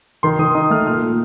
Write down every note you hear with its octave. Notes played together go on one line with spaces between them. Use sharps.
D#3 C6
D#3 D#6
D#4 D#6
A3 F6
A#2 F6
A#2